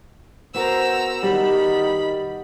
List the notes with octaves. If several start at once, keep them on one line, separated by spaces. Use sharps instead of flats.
B3 F#4 A#4 C5 A#5 E6
D#3 G3 B5